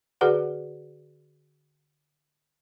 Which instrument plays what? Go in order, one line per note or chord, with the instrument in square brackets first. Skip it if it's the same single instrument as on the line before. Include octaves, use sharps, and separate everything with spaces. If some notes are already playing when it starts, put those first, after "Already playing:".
[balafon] D3 F#4 G#4 B4 D5 F#5